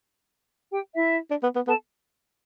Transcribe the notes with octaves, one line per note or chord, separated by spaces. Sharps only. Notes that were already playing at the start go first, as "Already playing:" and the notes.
G4 G5
E4 E5
D4
B3
B3
B3 A4 A5